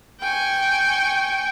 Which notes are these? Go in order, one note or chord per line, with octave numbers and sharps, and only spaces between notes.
G5 G#5 C#6